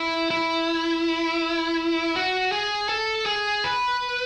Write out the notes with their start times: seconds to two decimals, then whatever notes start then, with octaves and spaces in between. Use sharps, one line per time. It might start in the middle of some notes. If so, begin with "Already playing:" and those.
Already playing: E4
0.31 E4
2.16 F#4
2.52 G#4
2.89 A4
3.26 G#4
3.64 B4